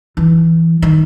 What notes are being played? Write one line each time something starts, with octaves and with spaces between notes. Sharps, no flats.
E3
D#3